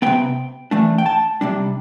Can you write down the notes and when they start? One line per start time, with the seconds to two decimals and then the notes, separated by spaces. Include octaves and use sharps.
0.02 E3 B3 G5
0.07 C3
0.71 E3 A3 D4
0.98 G5
1.06 A5
1.41 C3 G3 D4